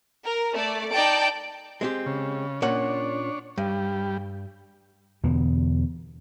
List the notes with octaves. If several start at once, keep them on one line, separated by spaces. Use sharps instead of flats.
A#4
A3 D5
D#4 D5 G5 A5 D7
G#3 C4 G4
C#3
A#2 C#4 D4 C#5 F#5
G2 G3
E2 B2 D3 E3